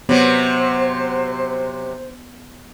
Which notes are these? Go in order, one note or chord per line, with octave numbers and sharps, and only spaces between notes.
C3 F#3 B3 C5